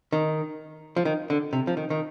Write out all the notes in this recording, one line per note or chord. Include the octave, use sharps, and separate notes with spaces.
D#3
F3
D#3
D3
C3
F3
D#3
D#3